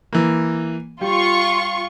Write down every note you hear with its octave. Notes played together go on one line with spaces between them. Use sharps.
E3 A#3
G3 F4 C#6